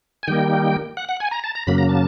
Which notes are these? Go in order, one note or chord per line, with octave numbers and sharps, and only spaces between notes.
G#5
D#3 G3 A#3 G5
F#5
F#5
G#5
A#5
A5
A#5
F#2 C#3 F#3 A#3 B5
A#5
A5